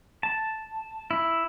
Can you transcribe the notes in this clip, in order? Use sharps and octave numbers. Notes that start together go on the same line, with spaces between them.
A5
E4